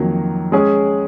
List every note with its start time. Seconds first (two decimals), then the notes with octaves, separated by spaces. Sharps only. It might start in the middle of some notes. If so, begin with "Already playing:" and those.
Already playing: F2 D#3 F#3 A#3
0.52 G#3 C#4 G#4